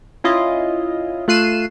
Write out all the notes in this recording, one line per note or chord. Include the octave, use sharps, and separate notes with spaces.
C#4 E4 F4 D#5
A3 F4 F#6 C7 D#7 E7